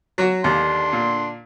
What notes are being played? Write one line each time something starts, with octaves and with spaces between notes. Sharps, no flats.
F#3 F#4
D#2 D3 D4 C6
A#2